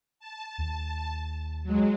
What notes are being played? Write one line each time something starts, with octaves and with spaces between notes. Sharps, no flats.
A5
D#2
F#3 G#3